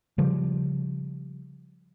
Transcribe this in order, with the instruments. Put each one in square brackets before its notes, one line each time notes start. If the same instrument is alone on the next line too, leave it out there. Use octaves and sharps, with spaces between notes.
[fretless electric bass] C#3 F3 G3